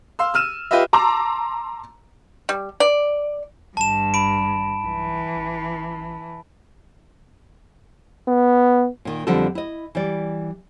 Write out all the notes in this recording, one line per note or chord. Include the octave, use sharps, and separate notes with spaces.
F5 C6 E6
E6 F6 D#7 E7
F4 G4 B4 D#5 E5
A5 A#5 C6 D6 E6
G3
D5
G#1 G2 A5 E7
B5 D7
B1 E3
A1
B3
A#2 D#3
F2 D3 F3 G3 A4
E4 D#5
E3 G3 D5